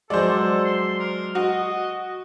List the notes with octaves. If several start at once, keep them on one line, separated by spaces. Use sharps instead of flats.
F#3 G#3 A4 C5 D5
C6
A#4
F#4 D#5